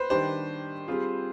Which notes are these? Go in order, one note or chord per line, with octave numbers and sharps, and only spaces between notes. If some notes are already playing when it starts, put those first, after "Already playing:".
Already playing: B4 C5
D#3 G3 D4 G4 C5
G3 C4 F4 G#4